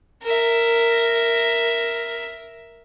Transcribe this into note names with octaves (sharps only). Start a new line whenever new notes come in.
A#4 E5